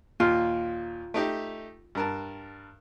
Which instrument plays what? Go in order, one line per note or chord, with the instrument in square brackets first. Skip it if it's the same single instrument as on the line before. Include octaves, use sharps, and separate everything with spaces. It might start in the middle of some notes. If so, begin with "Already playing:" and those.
[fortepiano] D#2 A#2 [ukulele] F4
[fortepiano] A3 D#4 G4
G2 A#4 A5